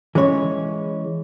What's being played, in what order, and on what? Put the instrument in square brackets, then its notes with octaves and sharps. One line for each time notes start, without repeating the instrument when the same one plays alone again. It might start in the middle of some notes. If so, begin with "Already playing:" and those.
[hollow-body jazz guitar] E3 G#3 C#4 C#5